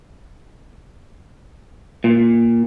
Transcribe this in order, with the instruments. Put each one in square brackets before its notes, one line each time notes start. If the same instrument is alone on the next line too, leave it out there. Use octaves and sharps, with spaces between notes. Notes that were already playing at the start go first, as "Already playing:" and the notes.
[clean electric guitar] A#2